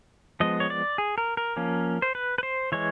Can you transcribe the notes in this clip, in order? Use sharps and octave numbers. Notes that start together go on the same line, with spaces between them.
F3 G#3 B3 D#5
C#5
D5
G#4
A#4
A#4
F3 A#3 C#4
C5
B4
B4
C5
E3 G#3 C#5